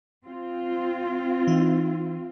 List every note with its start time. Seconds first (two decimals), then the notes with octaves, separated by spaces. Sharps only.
0.25 C4 F4
1.47 E3 D#4